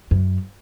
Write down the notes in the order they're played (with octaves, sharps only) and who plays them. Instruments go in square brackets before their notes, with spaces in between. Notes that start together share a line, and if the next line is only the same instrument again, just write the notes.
[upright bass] F#2